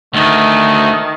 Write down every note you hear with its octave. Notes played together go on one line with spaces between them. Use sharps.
D2 D#3 A3